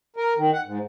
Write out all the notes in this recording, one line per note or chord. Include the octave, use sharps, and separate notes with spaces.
A#4
D#3
F#5
G#2